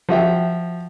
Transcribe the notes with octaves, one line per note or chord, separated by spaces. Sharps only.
F3 F#4 E5 G5